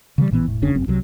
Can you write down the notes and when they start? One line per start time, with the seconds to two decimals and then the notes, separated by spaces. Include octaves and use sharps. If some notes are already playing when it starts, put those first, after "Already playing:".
0.18 C#3 E3 G3
0.31 A1 A#2 E3 B3
0.46 E1 A2
0.62 F1 D#2 C#3 D4
0.74 F1 F#2 C4
0.87 C2 C3 D#3 F#3